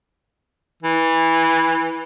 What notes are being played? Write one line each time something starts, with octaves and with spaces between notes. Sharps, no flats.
E3